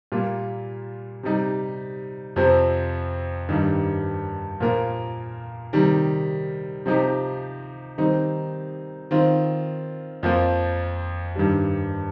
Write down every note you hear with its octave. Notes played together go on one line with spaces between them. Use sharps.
A#2 G3 A#3 F4
C3 G3 D#4
F2 C3 F3 C4
G2 D#3 G3 D#4
A#2 F3 A#3 F4 A#4
C3 D#3 G3
C3 F3 D#4 G4
D#3 G3 C4 D#4
D#3 C4 F4
F2 F3 A#3 F4
G2 D#3 G3